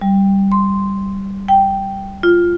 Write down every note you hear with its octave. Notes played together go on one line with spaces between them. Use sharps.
G3
C6
G5
F4